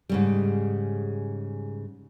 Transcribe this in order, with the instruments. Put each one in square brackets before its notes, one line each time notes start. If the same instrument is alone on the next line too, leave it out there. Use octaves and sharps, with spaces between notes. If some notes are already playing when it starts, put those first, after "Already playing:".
[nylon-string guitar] G#2 C#3 G3